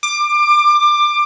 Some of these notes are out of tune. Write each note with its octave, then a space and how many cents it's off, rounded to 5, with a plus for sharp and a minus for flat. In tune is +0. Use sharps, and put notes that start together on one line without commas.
D6 +20